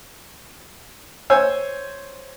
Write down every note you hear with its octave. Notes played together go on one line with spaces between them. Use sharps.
C5 C#5 G#5 E6